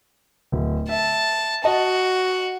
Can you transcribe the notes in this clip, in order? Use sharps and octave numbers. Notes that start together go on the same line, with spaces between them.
D1
E5 A5
F#4 D#5 A5